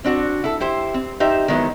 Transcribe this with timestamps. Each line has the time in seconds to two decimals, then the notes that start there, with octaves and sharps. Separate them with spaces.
0.04 C4 D4 F#4
0.44 E4 A4
0.60 E4 G4 C5
0.94 C4
1.20 D#4 G4 C5 E5
1.48 D#3 F#3 G#3 B3 E4